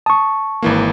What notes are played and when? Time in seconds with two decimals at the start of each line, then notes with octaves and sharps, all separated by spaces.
0.06 A5 C#6 D#6
0.62 G#1 E3 A#3